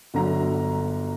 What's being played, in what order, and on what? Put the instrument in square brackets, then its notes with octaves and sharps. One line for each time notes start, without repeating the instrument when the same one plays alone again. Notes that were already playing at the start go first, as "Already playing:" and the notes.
[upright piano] G1 D3 F#3 A#5